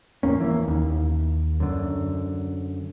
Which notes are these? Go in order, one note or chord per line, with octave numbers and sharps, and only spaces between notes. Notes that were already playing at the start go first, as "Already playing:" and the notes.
A1 E2 A#3 C#4
E3 A#3
D#2
F#2 D3